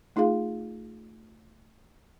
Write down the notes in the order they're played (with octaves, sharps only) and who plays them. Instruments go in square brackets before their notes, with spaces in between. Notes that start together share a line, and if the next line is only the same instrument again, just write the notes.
[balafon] A3 D#4 F4 G#4 F5